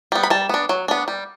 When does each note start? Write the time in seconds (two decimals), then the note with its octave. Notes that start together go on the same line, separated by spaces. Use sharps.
0.12 G3 B3
0.23 B5
0.30 G3 A5
0.49 B3 D4
0.69 F#3
0.88 B3 D4
1.08 G3